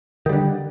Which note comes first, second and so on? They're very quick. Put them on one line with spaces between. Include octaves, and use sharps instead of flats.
D#3 G3 D3